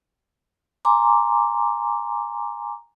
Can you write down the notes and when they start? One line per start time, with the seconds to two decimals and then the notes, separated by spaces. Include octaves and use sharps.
0.85 G#5 A#5 C6 D6